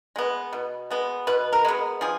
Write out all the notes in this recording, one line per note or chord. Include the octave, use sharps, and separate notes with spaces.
G#3 B3
B2
G#3 B3
B2 B4
A#4
G#3 B3
F3 G#4